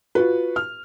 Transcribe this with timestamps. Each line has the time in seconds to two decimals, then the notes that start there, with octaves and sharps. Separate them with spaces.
0.15 F4 F#4 B4
0.56 F6